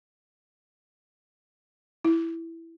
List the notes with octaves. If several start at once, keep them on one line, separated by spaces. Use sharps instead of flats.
E4